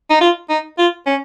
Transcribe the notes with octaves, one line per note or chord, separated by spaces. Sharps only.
D#4
F4
D#4
F4
C#4